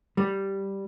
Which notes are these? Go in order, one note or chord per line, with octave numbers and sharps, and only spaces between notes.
G3